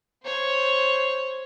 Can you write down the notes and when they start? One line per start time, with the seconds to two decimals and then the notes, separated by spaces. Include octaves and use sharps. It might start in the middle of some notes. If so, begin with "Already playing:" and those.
0.23 C5 C#5